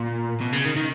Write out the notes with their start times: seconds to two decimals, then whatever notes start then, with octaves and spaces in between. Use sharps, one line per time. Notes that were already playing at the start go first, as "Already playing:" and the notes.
Already playing: A#2
0.41 B2
0.53 C#3
0.65 D#3
0.76 D#3